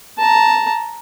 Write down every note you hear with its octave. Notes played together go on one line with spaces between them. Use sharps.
A5 A#5